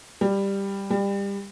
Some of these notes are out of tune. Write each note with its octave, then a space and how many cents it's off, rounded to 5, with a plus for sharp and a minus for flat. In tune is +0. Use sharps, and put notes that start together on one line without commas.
G3 +10
G3 +25